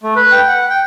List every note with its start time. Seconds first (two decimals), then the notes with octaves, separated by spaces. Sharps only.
0.03 A3
0.16 B4
0.32 G5
0.48 F#5
0.69 G5